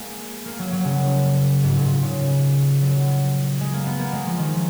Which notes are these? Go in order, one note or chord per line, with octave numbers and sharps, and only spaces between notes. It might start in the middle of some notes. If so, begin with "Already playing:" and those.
Already playing: G#3 A#3
A#3
F#3
F#3
C#3
G#2
A#2
C#3
F#3
G#3
A#3
B3
A#3
G#3
F3
D#3